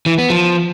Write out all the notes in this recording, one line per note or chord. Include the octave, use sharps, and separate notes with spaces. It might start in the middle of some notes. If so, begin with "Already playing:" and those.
E3
B3
F3